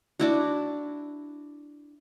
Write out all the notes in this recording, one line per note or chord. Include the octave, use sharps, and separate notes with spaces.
D4 E4 F#4